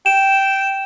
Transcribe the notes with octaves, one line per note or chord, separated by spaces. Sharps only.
G5 E7